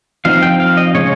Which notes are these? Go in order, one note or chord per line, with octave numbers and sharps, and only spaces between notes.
F3 C4 D#4 F5
G5
F5
D#5
C#3 G#3 C#4 C#5